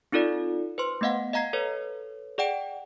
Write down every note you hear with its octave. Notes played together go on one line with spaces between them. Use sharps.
C4 D#4 F4 A4 D5
B4 C5 C6
A3 B3 D#5 F5 F#5
D#5 F5 A#5 G#6 C7
A4 B4 C#5
G#4 D5 F#5 G5 D7